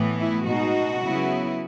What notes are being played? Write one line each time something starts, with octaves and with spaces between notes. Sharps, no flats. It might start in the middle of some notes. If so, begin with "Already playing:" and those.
Already playing: A2 E3 B3
E4
B2 G#3 D#4 F#4
C#3 F#3 B3 E4